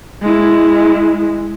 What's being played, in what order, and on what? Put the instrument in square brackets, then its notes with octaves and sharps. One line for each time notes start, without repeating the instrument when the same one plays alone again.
[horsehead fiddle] G#3 E4